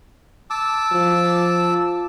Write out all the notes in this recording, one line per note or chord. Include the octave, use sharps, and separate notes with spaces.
A5 D6 E6
F3